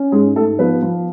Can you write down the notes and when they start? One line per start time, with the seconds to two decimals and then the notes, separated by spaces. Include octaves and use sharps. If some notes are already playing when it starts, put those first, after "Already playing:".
Already playing: C#4
0.12 G#2 G#3 G#4
0.36 G#2 A3 A4
0.59 F3 B3 B4
0.82 F3